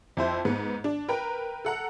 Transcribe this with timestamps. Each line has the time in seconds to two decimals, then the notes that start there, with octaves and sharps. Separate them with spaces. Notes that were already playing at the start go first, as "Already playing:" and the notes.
0.17 F2 E4 C5
0.45 G#2 B3
0.84 D4
1.08 A#4 B4 G5 A#5
1.65 A4 F#5 A#5